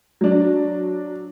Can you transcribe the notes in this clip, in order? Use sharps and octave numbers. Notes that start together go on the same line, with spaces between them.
F#3 D4